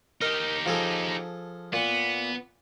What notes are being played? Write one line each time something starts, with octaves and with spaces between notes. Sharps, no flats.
D#4 G4 A#4 D#5
F3 G#4 A4
A#2 B3